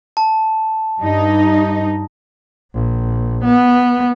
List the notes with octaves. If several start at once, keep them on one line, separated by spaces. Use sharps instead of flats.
A5
G2 D#4
A#1
B3